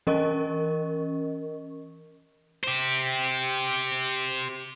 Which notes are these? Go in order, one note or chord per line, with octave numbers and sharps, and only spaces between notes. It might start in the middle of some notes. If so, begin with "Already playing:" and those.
E3 C#4 A#4 D#5 C#6
G4 C5